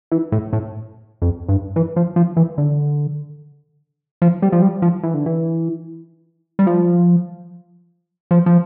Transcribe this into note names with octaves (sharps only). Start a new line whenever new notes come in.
E3
A2
A2
F2
G2
E3
F3
F3
E3
D3
F3
G3
F3
G3
F3
E3
D3
E3
G3
F3
F3
F3